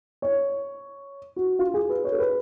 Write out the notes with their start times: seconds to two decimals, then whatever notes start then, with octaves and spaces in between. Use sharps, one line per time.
0.22 C#5
1.36 F#4
1.59 F4
1.74 G#4
1.89 B4
2.04 C#5
2.12 A4
2.19 B4